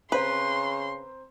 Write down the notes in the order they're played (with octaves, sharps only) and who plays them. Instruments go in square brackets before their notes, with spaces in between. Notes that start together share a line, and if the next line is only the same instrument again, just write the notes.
[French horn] C#3 [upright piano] C4 C5 A#5 [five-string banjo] B4 [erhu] C6